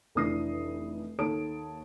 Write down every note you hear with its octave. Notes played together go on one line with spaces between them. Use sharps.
F1 E3 D4 D#6 A#6 C7
D#2 A4 C#5 A5 D#6 D7